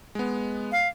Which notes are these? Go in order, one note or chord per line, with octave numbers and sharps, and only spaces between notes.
G#3 B3
F5